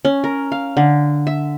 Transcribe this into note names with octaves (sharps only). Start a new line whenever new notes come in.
C#4
A#4
F5
D3
E5